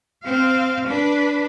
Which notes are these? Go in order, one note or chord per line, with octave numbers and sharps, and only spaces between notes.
C4 F5
D4 B4